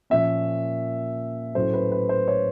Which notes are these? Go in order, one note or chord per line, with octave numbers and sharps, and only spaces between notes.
A#2 F3 A#3 C#4 E5
A2 F#3 A3 C#4 C5
B4
B4
C5
C#5